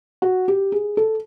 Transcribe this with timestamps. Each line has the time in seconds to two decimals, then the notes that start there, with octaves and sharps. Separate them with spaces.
0.22 F#4
0.48 G4
0.72 G#4
0.97 A4